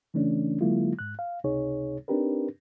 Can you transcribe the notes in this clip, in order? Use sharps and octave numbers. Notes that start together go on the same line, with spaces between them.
C#3 E3 A3 C#4 D4
D3 F#3 G#3 A#3 E4 F4
G#2 F#6
F5
C#2 C3 D#4 G#4 C#5
C4 D4 D#4 G4 A#4 B4